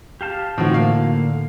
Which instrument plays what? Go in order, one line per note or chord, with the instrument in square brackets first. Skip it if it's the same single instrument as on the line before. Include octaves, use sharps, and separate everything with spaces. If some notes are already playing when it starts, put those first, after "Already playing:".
[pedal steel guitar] G4 F5 A5
[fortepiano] A2 F#4 [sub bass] D3 [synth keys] E3 F3 D#4 [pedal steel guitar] C4
[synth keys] A2 [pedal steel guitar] A#3 D4 [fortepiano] F5